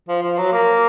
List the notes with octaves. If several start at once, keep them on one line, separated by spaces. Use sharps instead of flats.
F3
F3
F#3
A#3